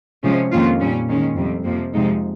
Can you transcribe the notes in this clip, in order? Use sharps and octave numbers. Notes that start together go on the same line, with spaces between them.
C3 F3 G#3 C#4
F2 D#3 A#3 C#4 F4
A#2 G3 C#4
D#3 G#3 C#4
F2 C3 G3
F2 C3 F3 A#3
F2 C3 F3 G#3 D#4